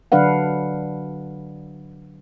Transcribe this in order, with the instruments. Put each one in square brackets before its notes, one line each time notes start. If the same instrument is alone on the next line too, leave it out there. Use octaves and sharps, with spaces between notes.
[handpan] D3 F#3 D4 B4 F5 F#5